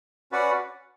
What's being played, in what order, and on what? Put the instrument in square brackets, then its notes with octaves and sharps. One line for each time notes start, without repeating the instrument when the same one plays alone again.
[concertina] C#4 F#4 B4 D5 F#5